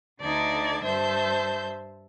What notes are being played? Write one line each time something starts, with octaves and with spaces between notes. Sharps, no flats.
D2 D3 D#4 D5 A5 G#6
G2 C5 E5 A5 G6